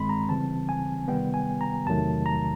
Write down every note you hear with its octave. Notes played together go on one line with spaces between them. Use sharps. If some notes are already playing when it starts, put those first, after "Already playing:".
Already playing: G2 D#3 G#3 C4 B5 C6
A#5
C#3 E3 G3 C4 A5
G#5
C3 D#3 G3 B3 G5
G#5
A#5
E2 C3 D#3 F#3 A3 A5
A#5